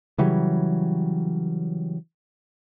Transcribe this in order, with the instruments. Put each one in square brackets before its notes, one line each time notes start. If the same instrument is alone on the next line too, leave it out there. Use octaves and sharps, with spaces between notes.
[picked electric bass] C#3 E3 F#3 G3